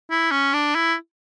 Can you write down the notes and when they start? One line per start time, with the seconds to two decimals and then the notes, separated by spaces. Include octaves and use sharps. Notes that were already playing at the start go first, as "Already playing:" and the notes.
0.10 E4
0.31 C#4
0.53 D4
0.75 E4